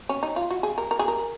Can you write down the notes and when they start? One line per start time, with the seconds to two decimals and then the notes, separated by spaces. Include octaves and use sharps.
0.09 C#4
0.23 D#4
0.36 F4
0.50 F#4
0.63 G#4
0.78 A#4
0.91 A#4
0.99 G#4
1.08 A#4